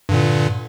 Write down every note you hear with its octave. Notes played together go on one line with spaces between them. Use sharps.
G2 A#2 D3